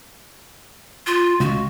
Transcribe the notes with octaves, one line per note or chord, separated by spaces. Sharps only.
F4
C#2 F#4